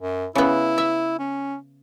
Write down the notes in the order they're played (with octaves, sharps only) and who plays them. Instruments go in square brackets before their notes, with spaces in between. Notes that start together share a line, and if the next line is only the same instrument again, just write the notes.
[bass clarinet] F#2
[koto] C#3 B3 [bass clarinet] E4
[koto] E5
[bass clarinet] C#4